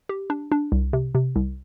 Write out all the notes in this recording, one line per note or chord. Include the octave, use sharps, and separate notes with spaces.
G4
D4
D4
C2
C3
C3
C2